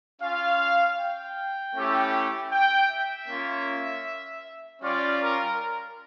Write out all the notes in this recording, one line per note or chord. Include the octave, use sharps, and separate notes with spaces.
C#4 F4 F5
G5
A3 C#4 E4 G4
G5
E5
A#3 C#4 F4
G3 C#4 F4 D5
A#4